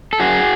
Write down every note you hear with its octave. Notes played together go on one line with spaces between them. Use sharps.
A4
F#2 F#4 G#4